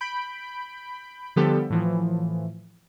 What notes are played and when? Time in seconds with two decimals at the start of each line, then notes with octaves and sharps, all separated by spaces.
0.01 B5 G6 B6 D7
1.36 D3 F3 G3 B3 G4 A4
1.70 A2 E3 F3